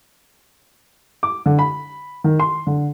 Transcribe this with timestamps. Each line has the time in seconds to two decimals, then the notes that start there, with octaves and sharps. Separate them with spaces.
1.23 D6
1.46 D3
1.59 B5
2.24 D#3
2.40 C6
2.67 D3